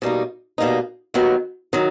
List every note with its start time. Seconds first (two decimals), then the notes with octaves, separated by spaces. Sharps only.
0.02 B2 G3 A#3 D#4
0.58 B2 G3 A#3 D#4
1.14 D#2 D#3 F#3 B3
1.73 D#3 F#3